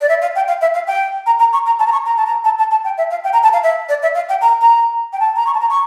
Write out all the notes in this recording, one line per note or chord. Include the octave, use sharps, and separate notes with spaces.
D5
E5
F5
G5
F5
E5
F5
G5
A#5
A#5
C#6
A#5
A5
A#5
C#6
A#5
A5
A#5
A5
A5
A5
G5
E5
F5
G5
A#5
A5
F5
E5
D5
E5
F5
G5
A#5
A#5
G5
A5
A#5
C#6
A5
A#5
C#6